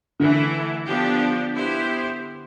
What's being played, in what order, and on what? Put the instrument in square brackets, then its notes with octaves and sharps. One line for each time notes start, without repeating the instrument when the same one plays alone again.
[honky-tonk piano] D3 [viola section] E3 A3 E4
[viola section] F3 B3 D4 G4
B3 E4 G4 C5